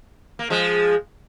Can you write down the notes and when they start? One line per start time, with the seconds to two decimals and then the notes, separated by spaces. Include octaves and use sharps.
0.39 A#3
0.50 F3 G#3